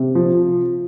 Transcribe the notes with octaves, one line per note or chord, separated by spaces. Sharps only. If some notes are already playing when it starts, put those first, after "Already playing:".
Already playing: C3
F3